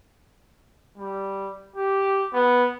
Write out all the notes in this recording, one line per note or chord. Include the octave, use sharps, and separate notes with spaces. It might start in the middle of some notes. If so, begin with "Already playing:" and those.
G3
G4
B3